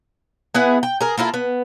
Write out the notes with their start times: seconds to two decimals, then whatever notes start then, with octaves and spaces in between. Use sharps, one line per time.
0.55 B3 E4 G#4 F#5
0.83 G5
1.01 G#4 A#4
1.17 A#3 E4 F4 A4
1.34 B3